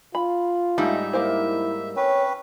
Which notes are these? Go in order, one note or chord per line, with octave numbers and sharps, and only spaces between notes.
F4 B5
G#2 G3 A3 D#4 E5
A#3 E4 A#4 C5
C4 C#4 B4 C#5